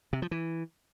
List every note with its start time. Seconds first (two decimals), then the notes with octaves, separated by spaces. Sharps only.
0.13 C3
0.22 F3
0.31 E3